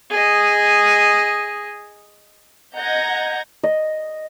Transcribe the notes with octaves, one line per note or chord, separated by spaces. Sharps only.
G#4 D#5
D#5 F#5 A#5 G6 G#6 A#6
D#5